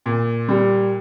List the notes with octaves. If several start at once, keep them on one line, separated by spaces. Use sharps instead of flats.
A#2
G3